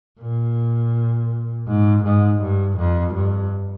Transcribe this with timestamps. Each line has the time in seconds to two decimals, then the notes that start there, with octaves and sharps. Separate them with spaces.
0.20 A#2
1.68 G#2
2.04 G#2
2.41 G2
2.78 F2
3.14 G2